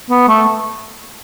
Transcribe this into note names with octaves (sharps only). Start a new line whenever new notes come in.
B3
A3